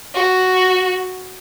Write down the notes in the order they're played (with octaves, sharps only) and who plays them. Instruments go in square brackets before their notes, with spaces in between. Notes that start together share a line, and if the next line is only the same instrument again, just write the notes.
[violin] F#4